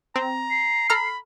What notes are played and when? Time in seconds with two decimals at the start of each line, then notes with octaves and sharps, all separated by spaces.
0.16 C4 A#5
0.50 C7
0.90 A4 A#5 B5 F6